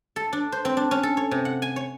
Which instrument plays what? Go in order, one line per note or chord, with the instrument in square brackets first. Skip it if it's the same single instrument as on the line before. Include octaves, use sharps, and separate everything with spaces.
[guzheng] A4
D4
C5
C4
D4
C#4
A4
C#5
C3
F#5
G#5
C#5